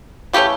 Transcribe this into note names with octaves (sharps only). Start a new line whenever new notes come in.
C#3 E3 A3 C#4 G4